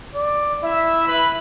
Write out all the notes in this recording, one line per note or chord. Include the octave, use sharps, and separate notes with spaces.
D5
E4 E5
B4 B5